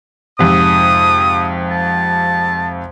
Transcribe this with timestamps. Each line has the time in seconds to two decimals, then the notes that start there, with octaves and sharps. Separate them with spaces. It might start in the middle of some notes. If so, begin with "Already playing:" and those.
0.39 F2 G#2 C3 D#6
1.71 A5